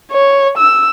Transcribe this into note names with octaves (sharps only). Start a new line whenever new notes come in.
C#5
E6